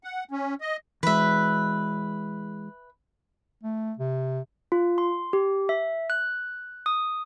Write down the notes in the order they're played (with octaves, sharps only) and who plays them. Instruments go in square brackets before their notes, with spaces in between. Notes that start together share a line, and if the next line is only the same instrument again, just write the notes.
[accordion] F#5
C#4
D#5
[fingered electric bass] E3 G#3 [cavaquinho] B4 E5
[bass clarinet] A3
C3
[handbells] F4
C6
G4
E5
F#6
D#6